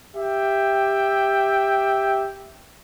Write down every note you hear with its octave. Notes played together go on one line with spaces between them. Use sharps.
G4 E5 G5